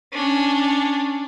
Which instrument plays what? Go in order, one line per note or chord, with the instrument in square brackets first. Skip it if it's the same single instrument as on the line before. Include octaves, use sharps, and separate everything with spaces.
[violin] C#4 D4